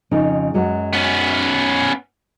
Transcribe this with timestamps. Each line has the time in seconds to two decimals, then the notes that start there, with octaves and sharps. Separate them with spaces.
0.11 F2 C#3 D#4
0.54 F#2 F#3 G#3
0.93 B3 C#4